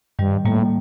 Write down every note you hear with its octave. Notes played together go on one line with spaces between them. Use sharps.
G2 D#3 G3
A2 G3 A#3